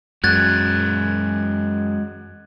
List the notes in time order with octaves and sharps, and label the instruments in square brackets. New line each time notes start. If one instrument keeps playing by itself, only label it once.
[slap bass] F#2 [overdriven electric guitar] G#3 F#4 [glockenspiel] F#6 G#6 A6